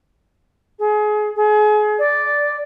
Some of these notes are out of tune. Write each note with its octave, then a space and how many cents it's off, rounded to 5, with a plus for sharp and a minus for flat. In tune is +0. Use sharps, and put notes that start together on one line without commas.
G#4 +30
G#4 +30
D5 -5